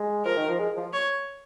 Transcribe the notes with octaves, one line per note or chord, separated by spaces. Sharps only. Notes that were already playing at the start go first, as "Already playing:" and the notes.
Already playing: G#3
F3 A#4
D#3
F3
G#3
F3
C#5